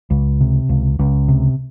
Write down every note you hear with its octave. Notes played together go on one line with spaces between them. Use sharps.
C#2
C3
C#2
C#2
C3